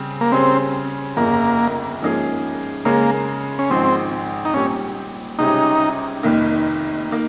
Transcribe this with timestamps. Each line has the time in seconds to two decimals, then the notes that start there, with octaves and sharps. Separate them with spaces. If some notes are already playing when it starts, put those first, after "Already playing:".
Already playing: C#3 G3 C4
0.21 A#3
0.32 C#3 G3 C4 C#4
1.16 G1 F2 C#3 A#3
2.02 G#2 F3 A#3 C#4 G#4
2.85 C#3 G#3 A#3 C#4
3.59 C#4
3.70 G#1 G#2 F3 C4
4.45 D#4
4.54 A#2 G3 C4 C#4 G4
5.39 C#2 C3 G3 C#4 D#4 G4
6.23 F1 D#2 D#3 A#3 D#4
7.10 D#3 A#3